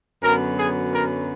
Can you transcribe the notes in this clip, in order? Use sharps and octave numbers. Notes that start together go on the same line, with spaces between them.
F#2 D3 F#3 B3 A#4
G#4
A#4